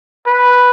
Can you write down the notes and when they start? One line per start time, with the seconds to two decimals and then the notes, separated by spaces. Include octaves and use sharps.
0.27 B4